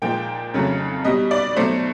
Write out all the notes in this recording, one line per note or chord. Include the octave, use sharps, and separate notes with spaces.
A#2 F3 G#3 G5
F2 C#3 F#3 A3
B2 G3 D#5
D5
B2 F#3 A3 C5